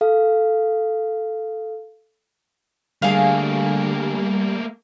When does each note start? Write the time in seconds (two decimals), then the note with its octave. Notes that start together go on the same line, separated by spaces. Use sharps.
0.01 A4 F5
3.02 D3 G3 A3 A#3 G#4 F5